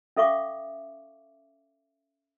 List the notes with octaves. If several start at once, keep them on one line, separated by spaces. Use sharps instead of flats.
C#4 A4 E5 F5 C#6 D6